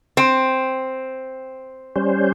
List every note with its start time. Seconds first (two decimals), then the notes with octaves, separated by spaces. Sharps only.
0.17 C4
1.96 G3 C#4 C5